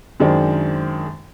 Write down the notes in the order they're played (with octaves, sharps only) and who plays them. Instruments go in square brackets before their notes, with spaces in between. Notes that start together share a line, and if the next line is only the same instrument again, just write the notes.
[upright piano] F#2 D#3 G#3 D4 C5